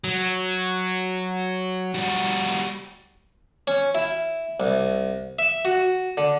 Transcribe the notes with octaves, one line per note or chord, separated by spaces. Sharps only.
F#3
G3 F#4
C#4
E4
C2
E5
F#4
D3